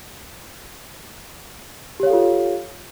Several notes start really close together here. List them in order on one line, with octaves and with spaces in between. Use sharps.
G4 C#5 F5 A4 F4